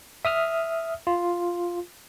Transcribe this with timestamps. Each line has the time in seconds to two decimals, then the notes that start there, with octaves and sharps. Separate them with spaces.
0.25 E5 D#6 F6
1.07 F4